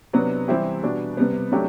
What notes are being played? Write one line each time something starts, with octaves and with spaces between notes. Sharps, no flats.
C3 F#3 B3 D4
E3 G3 C4 E4 G4
B2 G3 B3 D4 F#4
C3 G3 B3
C3 F#3 A3 D4 G4